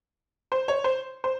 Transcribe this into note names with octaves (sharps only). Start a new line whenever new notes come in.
C5
C#5
C5
C5